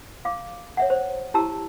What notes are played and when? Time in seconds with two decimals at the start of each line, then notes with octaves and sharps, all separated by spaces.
0.25 F5 D6
0.77 C#5 E5 F#5
0.90 C5
1.34 E4 G4 A5 A#5 E6